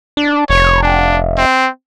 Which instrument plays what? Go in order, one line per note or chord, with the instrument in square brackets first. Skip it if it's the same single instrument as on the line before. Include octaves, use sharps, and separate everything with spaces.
[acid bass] D4
[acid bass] F1 [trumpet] C#5
[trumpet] D4
C4